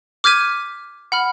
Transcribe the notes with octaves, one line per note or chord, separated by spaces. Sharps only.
D6 F6 G6 G#6 B6 D#7
F#5 B5 F6